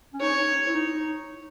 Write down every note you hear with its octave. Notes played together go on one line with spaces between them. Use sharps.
C#4
D#4 C#5
E4
D#4